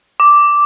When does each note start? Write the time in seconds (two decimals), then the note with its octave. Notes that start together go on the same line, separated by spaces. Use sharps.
0.20 D6